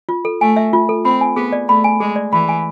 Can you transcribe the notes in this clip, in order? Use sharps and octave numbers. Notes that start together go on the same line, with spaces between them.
F4
A4
A3 G#5
E5
F4
A4
C4 B5
G#5
B3 G#4
D5
A3 B5
G#5
G#3 G#4
D5
E3 B5
G#5